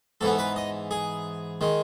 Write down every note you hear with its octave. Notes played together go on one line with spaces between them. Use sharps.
G#2 E3 B3 A4
B4
D#5
G#4
D#3 G#3